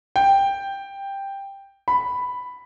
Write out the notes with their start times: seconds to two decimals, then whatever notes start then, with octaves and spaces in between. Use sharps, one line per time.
0.16 G5
1.88 B5